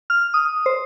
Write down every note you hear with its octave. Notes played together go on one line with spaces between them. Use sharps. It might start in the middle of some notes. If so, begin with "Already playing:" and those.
F6
D#6
C5